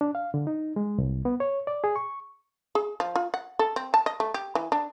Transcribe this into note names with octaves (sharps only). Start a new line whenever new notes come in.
D4
F5
D3
D#4
G#3
C2
B3
C#5
D5
G#4
C#6
G#4
F3
F4
F#5
A4
C4
A5
D#5
A3
G4
E3
D4